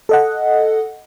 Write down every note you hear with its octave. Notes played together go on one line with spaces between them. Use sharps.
A4 D#5 F#5